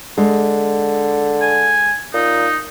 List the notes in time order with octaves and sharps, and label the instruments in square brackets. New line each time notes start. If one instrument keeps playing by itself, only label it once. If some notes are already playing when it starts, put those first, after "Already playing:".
[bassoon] D3 [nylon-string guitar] G#3
[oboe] G#5
[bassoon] A#2 [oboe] D#4